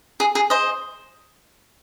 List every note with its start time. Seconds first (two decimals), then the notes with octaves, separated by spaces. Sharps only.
0.20 G#4
0.35 G#4
0.50 C5 D#5